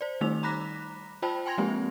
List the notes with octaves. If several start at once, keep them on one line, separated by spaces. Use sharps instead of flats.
C5 D5
D#3 G3 A3 D#4 E6 F7
A#5 B5 D6 F#6 A#6 B6
F4 C5 G5 A5 B5
G5 G#5 C6 G#6 A#6 F7
F3 G#3 A#3 C4 G4